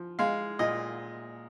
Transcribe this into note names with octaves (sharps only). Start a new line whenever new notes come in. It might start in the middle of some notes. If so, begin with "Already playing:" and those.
Already playing: F3
G#3 F5
A#2 D#5